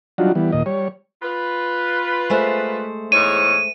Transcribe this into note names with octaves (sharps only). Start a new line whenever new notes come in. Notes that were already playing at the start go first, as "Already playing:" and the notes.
F#3 G3 D4 D#4 F4 F#4
E3 G3 B3
D#2 A#2 D#5
G3 C#5
F4 B4
G#3 A3 C5
E2 G#2 C#5 D#7